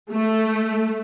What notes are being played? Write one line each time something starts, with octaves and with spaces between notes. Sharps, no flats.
A3